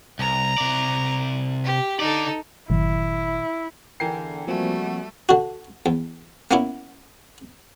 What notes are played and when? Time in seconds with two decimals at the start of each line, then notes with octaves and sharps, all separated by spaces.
0.19 C2 A#5
0.58 C3 D5
1.64 G4
2.00 D3 D#4 A4 D5
2.70 G1 A#2 D#3 F#3 E4
4.00 E2 D3 E3 A#4 G5 C7
4.47 F3 G3 A3 A#3 C4 F#4
5.29 D3 F#4
5.86 E2
6.51 A#3 B3 C#4 E4